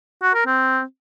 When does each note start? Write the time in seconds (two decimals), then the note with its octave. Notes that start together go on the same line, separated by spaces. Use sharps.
0.22 F#4
0.34 A#4
0.46 C4